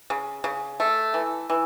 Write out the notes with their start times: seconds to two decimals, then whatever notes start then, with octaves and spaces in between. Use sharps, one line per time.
0.10 C#3
0.44 C#3
0.80 A3
1.14 E3
1.50 E3